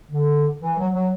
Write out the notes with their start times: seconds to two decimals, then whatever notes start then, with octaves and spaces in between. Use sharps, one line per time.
0.11 D3
0.60 E3
0.79 F#3
0.93 F#3